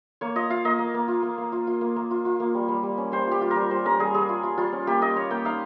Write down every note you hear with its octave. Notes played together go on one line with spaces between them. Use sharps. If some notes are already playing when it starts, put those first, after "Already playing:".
A#3 C#5
F4 D#5
F4 F5
A#3 D#5
A#3
A#3
F4
A#3
A#3
F4
F4
A#3
A#3
F4
F4
A#3
G3
G3
G3
C#4
G3 C5
F4 G4
F4
A#4
G3
G3 C5
C#4 A#4
G3 G#4
G3 G#4
F4
F4
G3 F4
C#4
A#3 G4
A#3 D#5
A#3 C#5
A#3 G5
D#4 F5